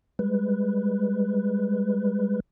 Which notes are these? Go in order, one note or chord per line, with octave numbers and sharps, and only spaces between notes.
G3 G#3 B4